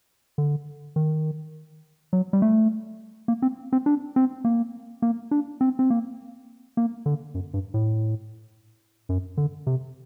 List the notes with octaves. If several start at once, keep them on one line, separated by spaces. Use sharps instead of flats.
D3
D#3
F#3
G3
A3
A#3
C4
C4
D4
C4
A#3
A#3
D4
C4
C4
A#3
A#3
D3
F#2
G2
A2
F#2
D3
C3